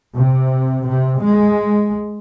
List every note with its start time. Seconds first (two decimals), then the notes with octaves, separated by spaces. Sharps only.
0.15 C3
0.85 C3
1.20 G#3